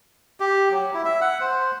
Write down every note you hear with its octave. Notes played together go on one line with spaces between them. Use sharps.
G4
F#3
E4
E5
F#5
C5